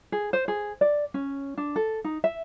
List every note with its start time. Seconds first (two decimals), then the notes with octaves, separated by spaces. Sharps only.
0.12 G#4
0.33 C5
0.48 G#4
0.81 D5
1.14 C#4
1.57 D4
1.76 A4
2.04 D#4
2.24 E5